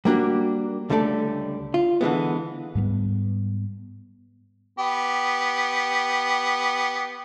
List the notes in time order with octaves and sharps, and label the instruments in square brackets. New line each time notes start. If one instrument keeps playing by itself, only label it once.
[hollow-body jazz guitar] G3 A#3 D4 F#4 G4
C#2 D3 G3 A3 A4 D5
F4
D3 E3 G#3 B3
[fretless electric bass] G#2 G3 G#3 B3
[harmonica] B3 G4